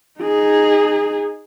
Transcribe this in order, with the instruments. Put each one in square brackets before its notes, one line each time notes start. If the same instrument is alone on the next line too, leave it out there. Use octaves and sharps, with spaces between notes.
[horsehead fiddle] D#4 G#4